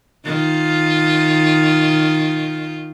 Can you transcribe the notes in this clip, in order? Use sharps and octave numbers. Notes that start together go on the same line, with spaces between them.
D#3 F4